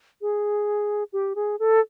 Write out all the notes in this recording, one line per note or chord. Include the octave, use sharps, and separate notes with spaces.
G#4
G4
G#4
A4